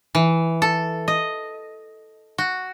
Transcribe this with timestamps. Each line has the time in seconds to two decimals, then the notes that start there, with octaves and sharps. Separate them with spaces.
0.15 E3
0.62 A4
1.08 D#5
2.38 F#4